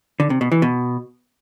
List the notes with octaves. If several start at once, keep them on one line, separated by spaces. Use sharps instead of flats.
D3
C3
B2
E3
B2